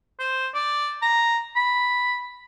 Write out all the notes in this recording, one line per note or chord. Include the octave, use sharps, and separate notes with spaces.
C5
D5
A#5
B5